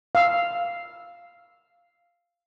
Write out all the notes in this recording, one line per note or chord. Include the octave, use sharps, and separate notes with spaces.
F5 E6